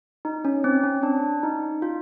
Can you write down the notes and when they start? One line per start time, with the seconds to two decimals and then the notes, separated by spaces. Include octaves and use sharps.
0.25 D#4
0.45 C#4
0.64 C4
0.84 C#4
1.03 D4
1.43 D#4
1.82 F4